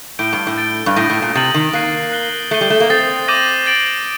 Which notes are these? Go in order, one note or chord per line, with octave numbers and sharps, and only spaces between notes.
A2 G6 D7 G7
G2
A2
A6 D7 G7
G2
A2 D#6 G6 A#6 D#7
A2
A#2
C3 D#6 A6 D#7 F#7
D#3
A#3 F#6 C7 D#7
F#6 C7 G7
A3 A6 C7 D#7 G7
G3
A3
A#3
C4 D#6 A6 C7
D6 G6 A#6 D#7 F#7
A6 D7 F#7